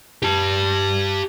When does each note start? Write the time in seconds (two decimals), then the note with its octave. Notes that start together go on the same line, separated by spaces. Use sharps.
0.22 G4 A5